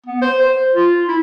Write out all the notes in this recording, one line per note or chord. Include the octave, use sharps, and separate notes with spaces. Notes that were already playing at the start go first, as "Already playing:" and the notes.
B3
C5
C5
F4
E4